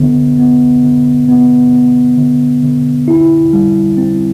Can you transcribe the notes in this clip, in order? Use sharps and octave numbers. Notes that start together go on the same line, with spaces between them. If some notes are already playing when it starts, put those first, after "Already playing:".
Already playing: D3 B3
B3
D3
B3
B3
D3
D3
E4
G3
C4